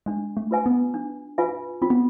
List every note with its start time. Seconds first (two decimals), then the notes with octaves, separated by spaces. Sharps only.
0.06 G#3 D4
0.37 A3
0.51 F4 B4 E5 G#5
0.66 B3
0.94 D4
1.38 F4 B4 E5 G#5
1.82 C4 F4
1.90 B3